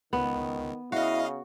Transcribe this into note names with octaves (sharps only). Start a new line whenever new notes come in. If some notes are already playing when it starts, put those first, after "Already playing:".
C#2 D#3 B3
C#3 E4 F#4 D#5 F5